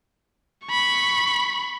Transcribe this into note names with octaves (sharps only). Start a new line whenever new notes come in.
B5 C#6